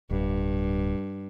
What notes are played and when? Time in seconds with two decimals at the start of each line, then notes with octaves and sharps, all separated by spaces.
0.11 D1 G2